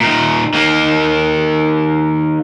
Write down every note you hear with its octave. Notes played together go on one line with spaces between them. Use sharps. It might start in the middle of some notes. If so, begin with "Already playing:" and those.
A#2 D#3
D#3 A#3